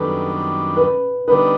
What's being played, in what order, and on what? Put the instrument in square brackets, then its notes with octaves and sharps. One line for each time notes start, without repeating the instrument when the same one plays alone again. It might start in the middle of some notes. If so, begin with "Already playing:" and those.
Already playing: [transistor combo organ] F#2 D#3 G3 B3 D4 [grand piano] A4 B4
[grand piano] B4
[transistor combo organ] D3 G3 B3 D#4 [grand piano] B4